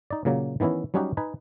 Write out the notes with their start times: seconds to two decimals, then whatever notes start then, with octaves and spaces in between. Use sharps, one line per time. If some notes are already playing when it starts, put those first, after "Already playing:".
0.11 D#4 D5
0.25 A#2 C#3 F#3 A#3
0.60 D#3 E3 B3 C#4 E4
0.94 F#3 G3 C#4 D#4 F#4 G4
1.17 D#4 B4 G#5